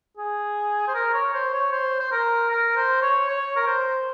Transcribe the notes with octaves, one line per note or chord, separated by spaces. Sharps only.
G#4
C5
A#4
C#5
C5
C#5
C5
C5
A#4
A#4
C5
C#5
C#5
A#4
C5